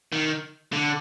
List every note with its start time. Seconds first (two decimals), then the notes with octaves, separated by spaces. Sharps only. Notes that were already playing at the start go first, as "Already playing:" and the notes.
0.12 D#3
0.73 D3